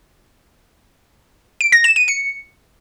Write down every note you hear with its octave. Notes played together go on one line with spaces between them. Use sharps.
D7
A#6
E7
D#7
C#7